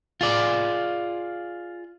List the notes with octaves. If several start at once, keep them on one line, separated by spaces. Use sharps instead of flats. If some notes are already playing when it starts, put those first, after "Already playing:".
F4 G#4 D5